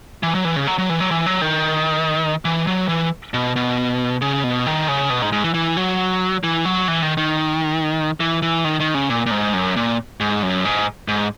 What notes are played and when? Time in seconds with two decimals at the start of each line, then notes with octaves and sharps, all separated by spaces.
0.23 E3
0.35 F#3
0.45 E3
0.56 C#3
0.67 F#3
0.78 F#3
0.89 E3
1.00 F#3
1.11 E3
1.26 F#3
1.42 D#3
2.45 E3
2.67 F#3
2.88 E3
3.34 B2
3.56 B2
4.21 C#3
4.44 B2
4.66 D#3
4.88 C#3
5.10 B2
5.22 G#2
5.32 G#2
5.44 E3
5.54 E3
5.77 F#3
6.44 E3
6.65 F#3
6.88 E3
7.02 D#3
7.17 D#3
8.20 E3
8.42 E3
8.64 D#3
8.80 D#3
8.94 C#3
9.10 A#2
9.26 A#2
9.31 G#2
9.54 F#2
9.76 A#2
10.20 G#2
10.43 F#2
10.65 G#2
11.08 G#2